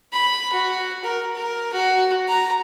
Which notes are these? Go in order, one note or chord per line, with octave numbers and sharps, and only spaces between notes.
B5
F#4
A#4
A#4
F#4
A#5